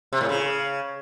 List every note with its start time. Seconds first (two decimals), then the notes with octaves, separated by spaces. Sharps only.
0.13 C3
0.21 A2
0.29 C#3